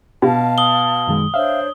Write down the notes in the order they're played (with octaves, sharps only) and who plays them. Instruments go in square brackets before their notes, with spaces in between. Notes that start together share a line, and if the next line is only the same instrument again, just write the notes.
[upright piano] B2 [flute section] F5 A5
[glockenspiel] D#6 F#7 G7
[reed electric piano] F#2 D#3 G#3
[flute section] D4 C5 C#5 [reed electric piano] E5 F5